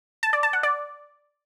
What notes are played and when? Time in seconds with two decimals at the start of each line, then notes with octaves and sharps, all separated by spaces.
0.23 A5
0.33 D5
0.43 A5
0.53 F#5
0.63 D5